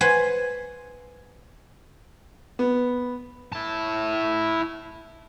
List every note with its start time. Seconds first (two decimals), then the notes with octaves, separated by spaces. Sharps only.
0.01 B4 C5 F#5 G#5
2.59 B3
3.53 E4 A5